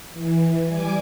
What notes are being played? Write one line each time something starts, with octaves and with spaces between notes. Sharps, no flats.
E3
G3 G#5 D6